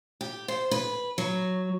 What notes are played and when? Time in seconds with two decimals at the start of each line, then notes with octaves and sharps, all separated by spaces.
0.21 G4
0.48 C5
0.71 B4
1.18 F#3